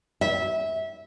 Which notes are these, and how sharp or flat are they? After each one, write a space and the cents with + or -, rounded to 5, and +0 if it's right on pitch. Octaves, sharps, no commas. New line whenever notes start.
E5 -20